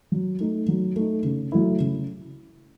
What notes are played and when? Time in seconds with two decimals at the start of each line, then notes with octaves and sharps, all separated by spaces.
0.12 F#3
0.40 A3 D#4
0.68 F#3
0.96 A3 D#4
1.24 C#3
1.52 F#3 A3 E4
1.80 C#3